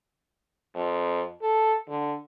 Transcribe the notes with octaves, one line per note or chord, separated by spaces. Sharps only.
F2
A4
D3